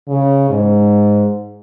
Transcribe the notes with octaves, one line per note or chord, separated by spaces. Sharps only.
C#3
G#2